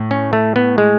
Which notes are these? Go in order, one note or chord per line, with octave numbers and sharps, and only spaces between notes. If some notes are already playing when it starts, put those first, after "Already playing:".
Already playing: A2
C#4
A3
B3
G#3